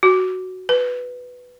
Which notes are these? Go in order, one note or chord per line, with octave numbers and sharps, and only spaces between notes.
F#4
B4